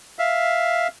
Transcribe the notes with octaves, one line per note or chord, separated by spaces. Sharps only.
E5 F5